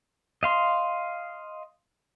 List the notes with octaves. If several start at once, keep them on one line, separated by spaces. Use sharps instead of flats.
D#5 F5 C6